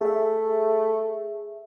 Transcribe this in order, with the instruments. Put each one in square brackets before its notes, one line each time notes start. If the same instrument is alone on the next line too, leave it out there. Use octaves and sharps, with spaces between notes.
[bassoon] A3 [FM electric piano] G#4 E5